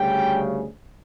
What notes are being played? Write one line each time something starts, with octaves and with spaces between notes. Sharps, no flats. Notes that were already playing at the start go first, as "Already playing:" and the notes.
Already playing: D2 C#3 G3 G5